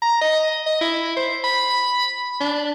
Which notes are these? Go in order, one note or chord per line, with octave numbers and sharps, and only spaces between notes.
A#5
D#5
D#5
E4
C5
B5
D4